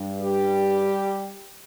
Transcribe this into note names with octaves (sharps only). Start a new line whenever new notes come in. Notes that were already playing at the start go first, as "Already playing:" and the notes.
Already playing: G2
G3 G4